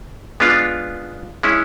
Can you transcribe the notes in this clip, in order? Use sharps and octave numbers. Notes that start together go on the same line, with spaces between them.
G#3 B3 D4 F4
G#3 C#4 E4